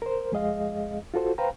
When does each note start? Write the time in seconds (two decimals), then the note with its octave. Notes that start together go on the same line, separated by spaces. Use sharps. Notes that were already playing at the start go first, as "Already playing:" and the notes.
0.02 A#4 C5
0.32 F2 G#3 G#4 D#5 F5
1.14 F4 F#4 A4 C5
1.38 B4 C5 F5 G5 A#5